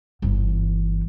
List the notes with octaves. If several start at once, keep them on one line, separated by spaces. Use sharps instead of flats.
G1 E3